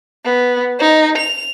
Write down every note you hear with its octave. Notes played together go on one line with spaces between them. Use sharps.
B3
D#4
F7